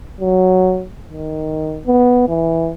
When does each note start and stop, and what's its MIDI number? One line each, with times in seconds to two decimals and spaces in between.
0.20 0.85 54
1.08 1.82 51
1.87 2.25 59
2.28 2.71 52